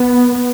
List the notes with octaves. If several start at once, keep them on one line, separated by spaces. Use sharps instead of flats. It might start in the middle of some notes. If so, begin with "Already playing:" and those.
Already playing: B3